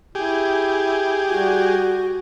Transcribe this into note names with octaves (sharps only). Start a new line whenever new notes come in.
E4 G4 G#4
G3 F#4